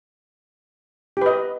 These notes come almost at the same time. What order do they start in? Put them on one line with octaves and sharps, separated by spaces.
G4 B4 D#5